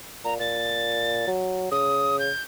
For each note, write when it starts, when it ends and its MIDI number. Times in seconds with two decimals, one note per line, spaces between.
0.25 0.37 46
0.25 0.34 82
0.40 1.23 46
0.40 1.29 93
1.27 1.66 54
1.71 2.29 49
1.71 2.19 87
2.19 2.42 91